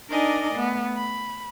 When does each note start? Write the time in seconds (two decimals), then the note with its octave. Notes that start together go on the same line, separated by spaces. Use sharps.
0.11 D4 D#4 A#4 D5 D#5 G#5
0.54 A3 B3
0.96 B5